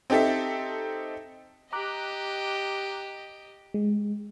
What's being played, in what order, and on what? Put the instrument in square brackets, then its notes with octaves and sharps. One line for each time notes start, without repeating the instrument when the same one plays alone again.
[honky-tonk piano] C4 D#4 G4 A4 E5
[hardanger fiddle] G4 D#5 [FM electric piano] A#5 D6 F#6
[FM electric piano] G#3